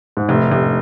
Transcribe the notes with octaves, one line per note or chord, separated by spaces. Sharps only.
G#2
F1 A2
F1